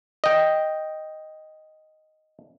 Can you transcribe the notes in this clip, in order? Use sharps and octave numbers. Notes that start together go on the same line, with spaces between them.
D#5 G5